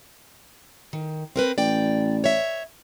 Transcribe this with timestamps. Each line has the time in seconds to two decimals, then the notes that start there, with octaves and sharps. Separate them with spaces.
0.93 D#3
1.36 C4 A#4 B4
1.58 A1 D5 G5
2.24 C#5 E5